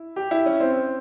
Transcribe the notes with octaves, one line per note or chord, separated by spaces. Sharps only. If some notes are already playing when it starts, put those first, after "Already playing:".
Already playing: E4
G4
E4
C#4
C4